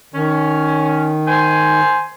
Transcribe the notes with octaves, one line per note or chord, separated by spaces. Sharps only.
D#3 C#4
C5 G#5